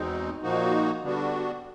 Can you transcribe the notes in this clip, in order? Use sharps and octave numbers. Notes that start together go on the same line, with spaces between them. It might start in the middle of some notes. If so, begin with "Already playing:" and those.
Already playing: E2 B2 G#3 C4 D#4
A#2 F3 A#3 D#4 F#4
D3 G3 B3 D4 F#4